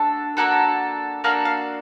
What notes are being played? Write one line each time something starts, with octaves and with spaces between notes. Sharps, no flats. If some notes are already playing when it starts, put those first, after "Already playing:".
Already playing: A3 D4 F#4 A4
A#3 D4 F#4 A4 F#5
A#3 D4 F#4 A4 F5
F5